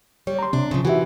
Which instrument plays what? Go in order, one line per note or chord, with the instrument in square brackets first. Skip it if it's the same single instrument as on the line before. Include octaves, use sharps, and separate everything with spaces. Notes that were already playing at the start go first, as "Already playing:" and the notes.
[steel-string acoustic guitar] G3 [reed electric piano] C#5
[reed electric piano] A#5 C6
[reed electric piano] C3 [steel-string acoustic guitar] D4
[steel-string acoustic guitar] C#3 F3
[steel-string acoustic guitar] D#3 E3 [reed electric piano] F#4 G4 E5